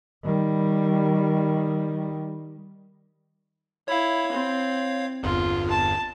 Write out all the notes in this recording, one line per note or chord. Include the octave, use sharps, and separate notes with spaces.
D#3 G3
E4 C#5 F5
C4
G1 E2 G2 F4
A5